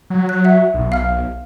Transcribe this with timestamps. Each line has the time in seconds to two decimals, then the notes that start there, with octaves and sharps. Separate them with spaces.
0.10 F#3
0.29 F#6
0.45 E5 F#5
0.74 B1
0.92 F5 F6